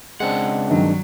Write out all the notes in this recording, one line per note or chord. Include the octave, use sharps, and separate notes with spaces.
C#2 G#3 C4 D4 F#5
G2 D#3 F#3